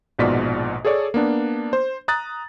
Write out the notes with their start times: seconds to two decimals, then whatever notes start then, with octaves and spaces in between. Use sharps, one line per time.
0.19 A#1 G#2 B2 F4 D5 B6
0.85 G#4 A4 C#5 D5
1.14 A#3 B3 D4
1.73 C5
2.08 A#5 D#6 F#6 A6